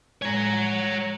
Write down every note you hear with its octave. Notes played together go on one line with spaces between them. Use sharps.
A2 G#3 C#5 A#5